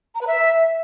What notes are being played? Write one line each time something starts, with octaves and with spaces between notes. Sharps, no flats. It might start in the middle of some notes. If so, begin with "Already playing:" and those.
A#5
B4
E5